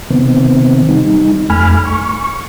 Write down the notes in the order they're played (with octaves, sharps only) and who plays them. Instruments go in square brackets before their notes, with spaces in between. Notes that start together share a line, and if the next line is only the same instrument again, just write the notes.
[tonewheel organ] C3 D#3 B3 C4
G3 D#4
F2 A3 G#5 B5 F6
C#6